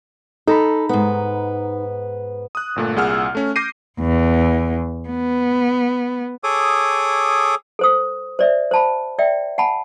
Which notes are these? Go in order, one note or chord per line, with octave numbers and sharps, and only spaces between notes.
D#4 A4 A#5 B5
G#2 B3
D#6 F#6
G1 A#2 A3
C2 A#2 G#4 F#5 E6 F6
A3 C#4
D6 G6 A#6 C7 D#7
E2
B3
G#4 A4 C#5 D6 D#6
A4 C5 D#6
C5 D5 E5
C5 A5 B5
D5 E5 G5
F#5 G#5 A5 B5